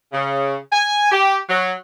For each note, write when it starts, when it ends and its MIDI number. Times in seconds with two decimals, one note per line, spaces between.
0.13 0.56 49
0.73 1.10 80
1.12 1.38 67
1.49 1.72 54